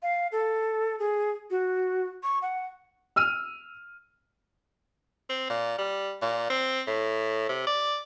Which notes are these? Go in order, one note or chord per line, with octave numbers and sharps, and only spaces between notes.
F5
A4
G#4
F#4
C#6
F#5
E6 F6 D#7
C4
A#2
G3
A#2
C4
A2
C3
D5